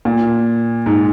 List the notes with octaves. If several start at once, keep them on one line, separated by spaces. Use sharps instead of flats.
A#2
G#2